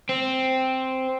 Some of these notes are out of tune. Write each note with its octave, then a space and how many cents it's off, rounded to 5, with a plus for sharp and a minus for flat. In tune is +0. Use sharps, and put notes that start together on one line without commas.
C4 +0